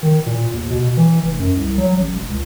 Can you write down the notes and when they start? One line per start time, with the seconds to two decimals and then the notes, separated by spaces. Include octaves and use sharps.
0.03 D#3
0.26 A#2
0.53 D#2
0.70 B2
0.97 E3
1.23 F1
1.39 F#2
1.56 C2
1.78 F#3
1.98 A1
2.12 E1
2.28 C#2